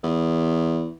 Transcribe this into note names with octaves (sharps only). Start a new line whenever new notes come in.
E2